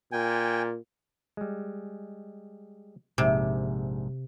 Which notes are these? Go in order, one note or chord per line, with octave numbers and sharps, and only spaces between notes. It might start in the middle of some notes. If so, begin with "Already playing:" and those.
A#2 G5 G#5
G3 G#3
A#1 G#2 C3 E5